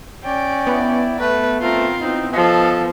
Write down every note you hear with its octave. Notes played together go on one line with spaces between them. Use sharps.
C#4 D5 G5
B3 E4
A3 B4
A3 C4 F4 A#4
C4 D#4 E4
F3 F4 A4 D#5